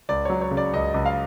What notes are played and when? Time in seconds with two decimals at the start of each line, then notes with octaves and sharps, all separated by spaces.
0.09 C#2 D5
0.25 F#3 C#5
0.41 C#5
0.51 C#3
0.57 D5
0.73 C#2 D#5
0.94 C#2
1.06 F5